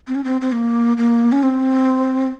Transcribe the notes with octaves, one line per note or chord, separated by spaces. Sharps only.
C4
C#4
C4
C4
A#3
A#3
C#4
C4